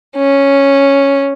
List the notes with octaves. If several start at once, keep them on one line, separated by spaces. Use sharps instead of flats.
C#4